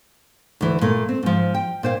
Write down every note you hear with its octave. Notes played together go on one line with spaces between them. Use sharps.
D2 E3
A#2 A3
C4
G#2 F3
G5
A#2 C5 F5